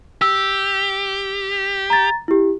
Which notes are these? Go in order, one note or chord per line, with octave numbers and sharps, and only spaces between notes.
G4 E6
A#5 A6
E4 G4